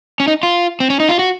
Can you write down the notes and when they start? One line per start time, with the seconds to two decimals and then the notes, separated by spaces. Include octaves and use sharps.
0.20 C#4
0.28 D#4
0.43 F4
0.80 C4
0.90 C#4
1.00 D#4
1.09 F4
1.19 F#4